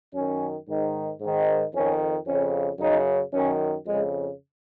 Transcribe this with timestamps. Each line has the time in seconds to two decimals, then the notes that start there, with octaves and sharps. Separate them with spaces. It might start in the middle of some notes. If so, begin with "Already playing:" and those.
0.14 F#2 D#3 C#4
0.68 G#2 D#3
1.20 G#2
1.25 D#3
1.74 F2 D#3 C#4
2.27 F2 C#3 C#4
2.79 F#2 C#3 D#4
3.32 F#2 D#3 C#4
3.85 F2 C#3 G#3